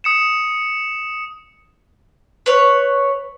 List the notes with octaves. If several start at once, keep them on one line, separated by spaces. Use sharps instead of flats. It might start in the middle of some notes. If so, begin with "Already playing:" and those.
D#6 C#7 E7
B4 C#5